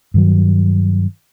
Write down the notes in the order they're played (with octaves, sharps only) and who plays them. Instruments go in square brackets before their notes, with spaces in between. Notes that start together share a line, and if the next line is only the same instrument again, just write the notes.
[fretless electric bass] G2 D#3 F#3